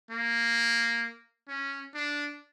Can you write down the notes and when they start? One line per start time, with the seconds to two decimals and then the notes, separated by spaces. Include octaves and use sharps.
0.11 A#3
1.48 C#4
1.95 D4